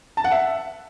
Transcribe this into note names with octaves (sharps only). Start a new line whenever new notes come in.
A5
F#5
E5